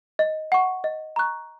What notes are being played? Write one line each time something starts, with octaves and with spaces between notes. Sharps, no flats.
D#5
F#5 C#6
D#5
A#5 C#6 F#6